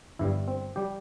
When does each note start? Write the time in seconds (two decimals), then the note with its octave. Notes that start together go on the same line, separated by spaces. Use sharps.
0.19 G1 G2 G3 E4
0.48 C4
0.76 G3 G4